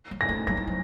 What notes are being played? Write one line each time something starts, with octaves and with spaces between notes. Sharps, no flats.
F#3
A#6
A3
F#3 A#6
A3
F#3